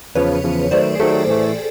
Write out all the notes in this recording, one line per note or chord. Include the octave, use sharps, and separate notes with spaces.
E2 C#3 F3 B4 C#5
E2 C#3 F3
D#3 F#3 A3 C5 D5
G#4
D#3 F#3 A3 G4 A4
A2 E3 A3